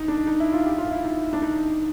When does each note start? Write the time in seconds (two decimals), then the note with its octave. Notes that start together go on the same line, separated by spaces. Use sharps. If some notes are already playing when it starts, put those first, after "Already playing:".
Already playing: D#4
0.08 D4
0.27 D#4
0.40 E4
0.52 F4
0.66 G4
0.78 F4
0.91 E4
1.04 D#4
1.33 D4
1.42 D#4